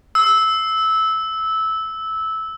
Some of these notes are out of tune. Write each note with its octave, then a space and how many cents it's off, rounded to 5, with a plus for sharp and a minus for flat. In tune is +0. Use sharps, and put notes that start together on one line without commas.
E6 -15